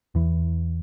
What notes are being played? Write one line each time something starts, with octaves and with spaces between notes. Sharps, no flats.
E2 E3